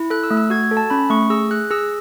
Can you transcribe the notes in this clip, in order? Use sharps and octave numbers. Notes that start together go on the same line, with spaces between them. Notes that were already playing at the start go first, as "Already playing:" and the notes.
Already playing: E4
A4 F#6
E6
A3
E6
F#4 G#6
G#6
A4
A5
C#4 B5
A3 C#6
G#4 E6
G#4 F#6
G#4 E6